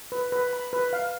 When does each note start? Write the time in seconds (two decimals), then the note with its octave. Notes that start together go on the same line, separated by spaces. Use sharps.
0.12 B4
0.32 B4
0.53 B5
0.73 B4
0.93 F5